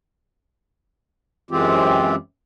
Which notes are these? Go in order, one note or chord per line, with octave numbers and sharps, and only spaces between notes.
F#2 E3 G#3 C4 F4 G4